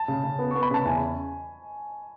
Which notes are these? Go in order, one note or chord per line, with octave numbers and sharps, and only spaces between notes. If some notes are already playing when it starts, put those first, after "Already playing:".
Already playing: A5
C#3
C#3
B3
B3 C#6
B5
C#3 A5
E2 G#5